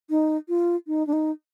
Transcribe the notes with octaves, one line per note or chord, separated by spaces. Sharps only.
D#4
F4
D#4
D4
D#4